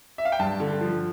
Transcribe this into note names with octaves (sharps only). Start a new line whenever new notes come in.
E5
F5
G5
G2 A5
D3
F3